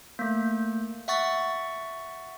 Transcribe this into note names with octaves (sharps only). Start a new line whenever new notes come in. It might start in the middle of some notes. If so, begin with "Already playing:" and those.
A3 A#3
E5 F#5 C#6 A6